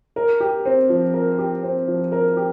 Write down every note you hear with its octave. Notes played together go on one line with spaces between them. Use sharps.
A#4
G4
C4
F3
A#4
G4
C4
F3
A#4
G4